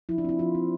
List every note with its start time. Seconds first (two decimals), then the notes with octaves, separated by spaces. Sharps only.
0.09 F3 E4
0.18 D4
0.24 C4 E4
0.39 F3 F4
0.55 C4